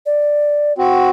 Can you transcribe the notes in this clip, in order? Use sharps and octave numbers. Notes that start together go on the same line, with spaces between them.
D5
C4 F#4